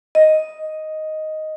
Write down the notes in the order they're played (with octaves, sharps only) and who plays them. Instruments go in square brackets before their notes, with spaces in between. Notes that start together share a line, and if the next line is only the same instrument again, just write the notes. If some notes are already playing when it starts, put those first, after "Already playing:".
[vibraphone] D#5